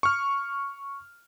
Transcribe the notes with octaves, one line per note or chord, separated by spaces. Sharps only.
C#6 F6